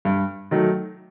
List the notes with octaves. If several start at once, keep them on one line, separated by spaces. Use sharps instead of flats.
G2
D#3 F#3 A3